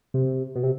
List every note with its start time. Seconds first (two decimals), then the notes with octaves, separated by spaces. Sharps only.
0.14 C3
0.55 B2
0.63 C3